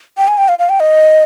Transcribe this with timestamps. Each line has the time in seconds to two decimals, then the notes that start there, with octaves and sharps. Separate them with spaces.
0.18 G5
0.28 G#5
0.38 G5
0.48 F5
0.59 F5
0.69 G5
0.80 D#5